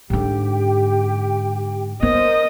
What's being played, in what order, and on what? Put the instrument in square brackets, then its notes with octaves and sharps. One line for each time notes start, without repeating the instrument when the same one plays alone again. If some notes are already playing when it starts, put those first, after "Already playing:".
[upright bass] G#2 D3 [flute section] G4 G5
[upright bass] B3 [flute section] A#4 C5 [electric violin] D#5